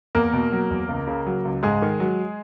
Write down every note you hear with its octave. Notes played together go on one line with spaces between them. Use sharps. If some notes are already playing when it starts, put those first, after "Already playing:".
E2 A#3 A#4
B2
F#3
E2
C#2
C#3
F#3
C#2
G#2 G#3 G#4
D#3
F#3